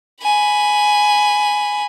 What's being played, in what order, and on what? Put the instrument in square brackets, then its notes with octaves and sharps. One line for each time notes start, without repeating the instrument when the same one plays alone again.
[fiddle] G#5 B5